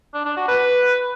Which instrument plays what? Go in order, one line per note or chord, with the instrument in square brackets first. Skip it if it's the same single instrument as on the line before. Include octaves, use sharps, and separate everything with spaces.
[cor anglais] D4
D4
F#4
B4